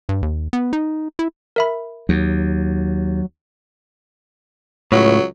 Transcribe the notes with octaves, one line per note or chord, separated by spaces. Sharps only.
G2
D#2
B3
D#4
E4
A#4 E5 B5
D#2 F#3
C#2 A2 F#3